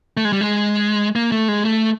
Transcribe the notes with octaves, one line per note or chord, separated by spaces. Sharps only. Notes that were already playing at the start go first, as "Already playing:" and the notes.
A3
G#3
G3
G#3
A#3
A3
G#3
A3